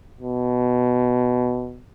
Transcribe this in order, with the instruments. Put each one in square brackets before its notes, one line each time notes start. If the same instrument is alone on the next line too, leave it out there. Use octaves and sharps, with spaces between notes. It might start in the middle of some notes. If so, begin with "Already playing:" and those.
[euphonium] B2